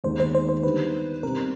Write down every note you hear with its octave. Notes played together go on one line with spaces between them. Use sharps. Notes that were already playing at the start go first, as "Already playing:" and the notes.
D#2 D#3 G#3 B3 D#4 C5
C5
C5
C5
D3 G3 B3 D#4 G4 B4
B2 G3 C4 A#4